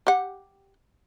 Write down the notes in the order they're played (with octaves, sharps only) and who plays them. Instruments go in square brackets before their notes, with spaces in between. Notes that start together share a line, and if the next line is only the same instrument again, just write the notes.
[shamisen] G4 F#5